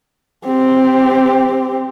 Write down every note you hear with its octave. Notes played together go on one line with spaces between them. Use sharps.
C4 G4